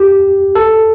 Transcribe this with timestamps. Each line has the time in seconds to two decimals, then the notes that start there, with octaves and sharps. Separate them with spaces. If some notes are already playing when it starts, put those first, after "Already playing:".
Already playing: G4
0.55 A4